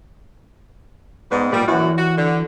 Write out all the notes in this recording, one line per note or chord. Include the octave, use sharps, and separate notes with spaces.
G#2 G3 B3
A#2 G3
F#2 E3 F#4
F#4
D3